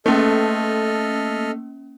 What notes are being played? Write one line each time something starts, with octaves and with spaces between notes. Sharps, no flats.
A3 A#3 C#4 A4 D#5 F6